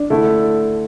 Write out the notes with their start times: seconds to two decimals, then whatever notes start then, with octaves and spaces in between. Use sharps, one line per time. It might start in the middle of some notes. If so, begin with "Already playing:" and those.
Already playing: D4
0.10 D3 A3 E4 A4